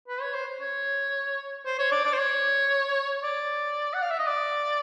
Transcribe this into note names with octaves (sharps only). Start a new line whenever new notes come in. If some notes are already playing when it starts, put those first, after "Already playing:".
B4
C#5
C5
C#5
C5
C#5
D5
D5
C5
C#5
D5
F#5
F5
E5
D#5
D5